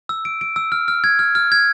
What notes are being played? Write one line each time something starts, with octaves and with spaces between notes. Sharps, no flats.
E6
D7
D7
E6
F6
F6
G#6
F6
F6
G#6